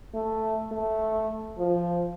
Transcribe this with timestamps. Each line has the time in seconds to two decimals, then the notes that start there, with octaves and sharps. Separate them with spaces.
0.14 A3
0.72 A3
1.58 F3